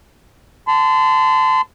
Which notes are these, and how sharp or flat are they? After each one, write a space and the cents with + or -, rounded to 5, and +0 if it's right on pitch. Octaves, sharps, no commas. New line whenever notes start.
A5 +0 C6 -35